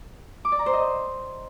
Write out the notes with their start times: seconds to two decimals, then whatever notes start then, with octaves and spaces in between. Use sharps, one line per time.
0.45 D6
0.52 D5
0.59 A#5
0.66 C5
0.73 D#5